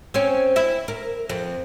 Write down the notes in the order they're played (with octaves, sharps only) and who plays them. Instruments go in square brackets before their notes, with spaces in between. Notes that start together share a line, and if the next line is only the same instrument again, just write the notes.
[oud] C4 C#4 C#5
E4 E5
A#4
F2